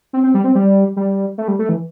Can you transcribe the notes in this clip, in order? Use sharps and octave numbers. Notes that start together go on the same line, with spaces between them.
C4
C4
G3
C4
G3
G3
A3
G3
A3
E3